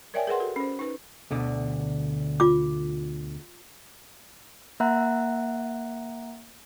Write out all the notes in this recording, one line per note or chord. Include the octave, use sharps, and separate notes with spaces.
A#4 C#5 D5 E5 G5 G#5
G#4 A#4 B4 F#5 C6
F#4 A4
C#4 C5
D#4 B4
D2 B2 D3
F4 D6
A#3 E5 F#5 A#5 F#6